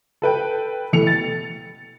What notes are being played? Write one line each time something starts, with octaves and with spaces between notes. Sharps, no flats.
A4 B4 G5
B2 E3 A3 C#7 F7
A6